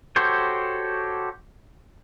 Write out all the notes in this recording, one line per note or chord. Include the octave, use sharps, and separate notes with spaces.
F#4 G4 A4 C5 C#5